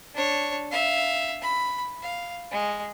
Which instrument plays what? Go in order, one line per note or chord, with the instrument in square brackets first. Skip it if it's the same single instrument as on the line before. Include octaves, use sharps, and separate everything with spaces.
[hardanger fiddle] D4 C#5
E5 F5
B5
F5
G#3